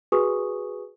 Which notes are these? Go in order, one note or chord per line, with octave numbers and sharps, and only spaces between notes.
F#4 G#4 B4 G#5 C#6 D#6